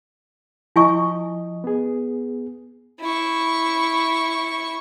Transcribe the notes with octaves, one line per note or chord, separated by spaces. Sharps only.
F3 E4 D#5 G#5 C#6
B3 G#4
E4 C#6